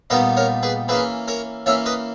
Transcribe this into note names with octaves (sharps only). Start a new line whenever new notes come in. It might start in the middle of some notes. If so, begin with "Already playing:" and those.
A#2 G3 B3 D#4 B4 D#5
A#4 C#5
G#4 B4
E3 A#3 C#4 G#4 B4
A#4 C#5
E3 A#3 C#4 C#5 E5
B4 D#5